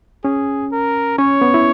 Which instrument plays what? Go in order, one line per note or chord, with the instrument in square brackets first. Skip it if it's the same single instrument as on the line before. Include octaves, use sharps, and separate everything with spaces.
[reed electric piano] C#4 [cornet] G#4
[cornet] A#4
[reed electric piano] C#4 [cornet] C#5
[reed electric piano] B3
E4